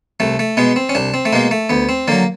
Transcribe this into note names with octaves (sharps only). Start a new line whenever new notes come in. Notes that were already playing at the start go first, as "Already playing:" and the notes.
C2 A3
A3
B2 G#3 B3
C4
C#4
C2 D4
C4
A3
B2 G#3 A#3
A3
D2 B3
C4
D3 F#3 A#3